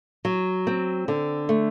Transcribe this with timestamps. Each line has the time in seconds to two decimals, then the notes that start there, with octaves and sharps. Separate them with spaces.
0.25 F#3
0.67 C4
1.08 D3
1.49 A3